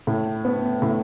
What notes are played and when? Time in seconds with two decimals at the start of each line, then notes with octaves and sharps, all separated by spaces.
0.07 A2
0.45 B3
0.82 A2